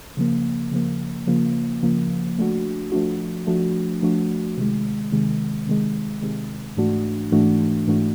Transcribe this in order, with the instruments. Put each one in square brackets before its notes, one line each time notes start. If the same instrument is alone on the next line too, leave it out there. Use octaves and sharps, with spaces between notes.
[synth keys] C#3 F3 A#3
C#3 F3 A#3
C#3 F3 A#3
C#3 F3 A#3
F3 A3 D4 F#4
F3 A3 D4 F#4
F3 A3 D4 F#4
F3 A3 D4 F#4
C3 D#3 G#3
C3 D#3 G#3
C3 D#3 G#3
C3 D#3 G#3
G#2 E3 A3 D4 F#4
G#2 E3 A3 D4 F#4
G#2 E3 A3 D4 F#4